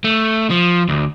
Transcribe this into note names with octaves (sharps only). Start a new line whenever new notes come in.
A3
F3
D2